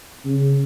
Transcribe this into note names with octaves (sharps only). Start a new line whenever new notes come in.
C#3